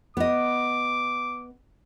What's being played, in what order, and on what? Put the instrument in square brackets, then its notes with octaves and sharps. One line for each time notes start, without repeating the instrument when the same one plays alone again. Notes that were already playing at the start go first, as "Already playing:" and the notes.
[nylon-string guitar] B3 D#5 [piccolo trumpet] D6